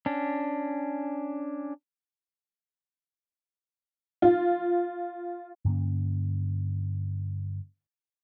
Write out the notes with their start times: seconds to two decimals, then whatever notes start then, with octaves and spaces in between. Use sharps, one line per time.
0.06 C#4 D4
4.22 F4
5.65 G2 D3 A#3 C#4